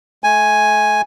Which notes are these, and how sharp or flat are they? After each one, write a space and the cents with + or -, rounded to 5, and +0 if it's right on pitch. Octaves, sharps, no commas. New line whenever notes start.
A3 -35 G#5 +0